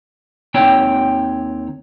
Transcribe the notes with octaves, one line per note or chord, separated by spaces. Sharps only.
D#2 C4 D#4 C#5 G5